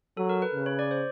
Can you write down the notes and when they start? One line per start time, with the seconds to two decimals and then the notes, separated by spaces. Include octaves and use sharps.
0.17 F#3 A4
0.29 A#4
0.42 B4
0.54 C#3
0.66 C#5
0.79 D5
0.91 C5